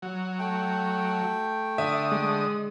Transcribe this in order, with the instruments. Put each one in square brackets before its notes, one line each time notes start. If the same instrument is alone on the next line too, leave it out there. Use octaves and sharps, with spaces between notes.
[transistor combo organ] F#3
[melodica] A3 G5
[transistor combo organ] D3 D#6 [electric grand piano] E5
[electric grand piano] G#3